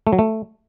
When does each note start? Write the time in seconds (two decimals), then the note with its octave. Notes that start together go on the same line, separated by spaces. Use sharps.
0.07 A3
0.13 F#3
0.19 A3